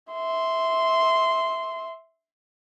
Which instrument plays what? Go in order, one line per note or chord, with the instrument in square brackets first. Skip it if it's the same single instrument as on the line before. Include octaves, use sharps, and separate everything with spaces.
[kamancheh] E5 C6